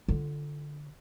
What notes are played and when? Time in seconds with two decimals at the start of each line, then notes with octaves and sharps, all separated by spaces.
0.08 D3 F4